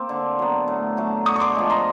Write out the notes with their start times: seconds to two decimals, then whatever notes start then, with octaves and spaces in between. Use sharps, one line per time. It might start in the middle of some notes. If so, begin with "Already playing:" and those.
Already playing: A#3 C4 D6
0.09 D3
0.39 F#3 B3
0.68 A2
0.97 F#3 A3
1.26 D3 C#6 D#6
1.36 C#6
1.40 C6 D6
1.55 F3 G#3
1.70 A#5 C6